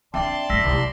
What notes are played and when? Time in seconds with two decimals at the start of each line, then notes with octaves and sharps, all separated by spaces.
0.14 C4 D4 D5 E5 G5 A5 C6
0.50 G#1 E3 E6 A#6 B6
0.61 C2
0.73 F#3